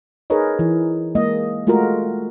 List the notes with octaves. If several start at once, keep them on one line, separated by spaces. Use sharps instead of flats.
D#4 G#4 A#4 B4 C#5 D#5
E3
G#3 A#3 D#5
G#3 A3 F4 F#4 A#4